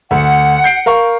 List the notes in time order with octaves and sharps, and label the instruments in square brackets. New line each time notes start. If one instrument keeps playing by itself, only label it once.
[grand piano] D2 [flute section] F#5
[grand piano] G6 C7 D7
A#4 F5 C#6